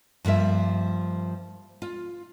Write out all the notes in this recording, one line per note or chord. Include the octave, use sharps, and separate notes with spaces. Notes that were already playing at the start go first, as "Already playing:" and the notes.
G2 F3 A#3 E5
F4